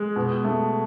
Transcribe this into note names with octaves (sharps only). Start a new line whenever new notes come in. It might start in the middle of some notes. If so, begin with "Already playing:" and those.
Already playing: G#3
B2
A3